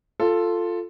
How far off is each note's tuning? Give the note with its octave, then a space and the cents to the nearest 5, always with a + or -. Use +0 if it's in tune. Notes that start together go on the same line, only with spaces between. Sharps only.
F4 +0 A4 +5